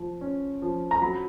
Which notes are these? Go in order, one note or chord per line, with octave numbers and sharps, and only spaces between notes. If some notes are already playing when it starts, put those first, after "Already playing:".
Already playing: F3
C#4
F3
A#5
F#3 B5